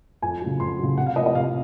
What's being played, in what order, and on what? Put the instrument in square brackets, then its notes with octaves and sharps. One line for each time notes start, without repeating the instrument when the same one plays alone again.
[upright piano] F2 G#5
C#3 F#3
F2 C6
C#3 F#3
C3 F#5
F5
F3 A#3 D#5
D#5
C3 F5